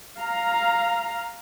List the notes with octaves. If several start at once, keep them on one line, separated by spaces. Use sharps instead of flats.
F5 A#5